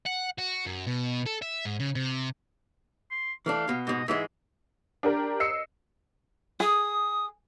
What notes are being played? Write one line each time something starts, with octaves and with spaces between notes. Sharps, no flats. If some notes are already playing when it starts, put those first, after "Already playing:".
F#5
F#4
F#2
B2
A4
E5
G#2
C#3
C3
C6
E3 A3 D4 F5
B2
G#2 B2 D#5
G#2 E3 G#3 E5
D4 G4 A#4
D#5 E6 C7 C#7
G#4 D#6